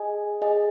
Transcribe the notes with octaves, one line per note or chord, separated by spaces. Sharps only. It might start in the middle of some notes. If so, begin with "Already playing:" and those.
Already playing: G#4 D#5 G#5
G#4 D#5 G#5